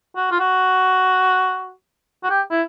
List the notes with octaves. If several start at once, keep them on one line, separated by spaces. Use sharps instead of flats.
F#4
F4
F#4
F#4
G4
E4